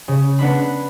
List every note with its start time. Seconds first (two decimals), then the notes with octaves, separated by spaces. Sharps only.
0.08 C#3
0.39 B3 D4 B5